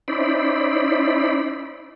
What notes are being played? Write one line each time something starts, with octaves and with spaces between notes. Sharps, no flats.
C#4 D#4 E4 C5 D5 B5